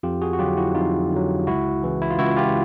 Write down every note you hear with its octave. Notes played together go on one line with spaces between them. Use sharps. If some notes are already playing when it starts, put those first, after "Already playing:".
F2 F4 G4
F#4 G#4
F#4
D3 F#3 F4 G4
E4 F#4
F2 D#4 F4
D3 F#3
C#2 E4 F#4
C#3 E3
E4
F4
C#2 E4 F#4
F4 G4